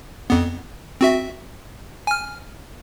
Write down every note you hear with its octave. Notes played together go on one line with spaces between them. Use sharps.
F2 B3
C4 F#4 E5
G#5 F6